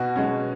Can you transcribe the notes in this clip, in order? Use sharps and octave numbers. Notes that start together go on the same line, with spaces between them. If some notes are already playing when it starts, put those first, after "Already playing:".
Already playing: B2 F#4
G#3 C#4